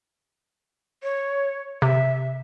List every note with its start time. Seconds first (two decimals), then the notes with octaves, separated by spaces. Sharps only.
1.03 C#5
1.82 C3 E5